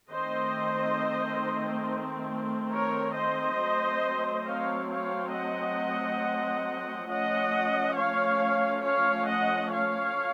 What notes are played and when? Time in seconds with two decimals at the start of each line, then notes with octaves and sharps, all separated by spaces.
0.11 D#3 A3 C4 C5 D#5
2.73 A#4 C#5
3.16 C5 D#5
3.61 F#3 A3 C4
4.47 C#5 F5
4.92 C#5 F5
5.35 D#5 F#5
7.10 F3 A3 C#4 D#5 F#5
7.98 C#5 F5
8.85 C#5 F5
9.28 D#5 F#5
9.72 C#5 F5